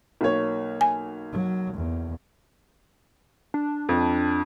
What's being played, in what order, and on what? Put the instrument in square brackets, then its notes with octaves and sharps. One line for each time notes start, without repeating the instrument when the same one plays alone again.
[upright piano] B1 A#3 C#5
[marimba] G#5
[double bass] F#3
E2
[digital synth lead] D4
[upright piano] F2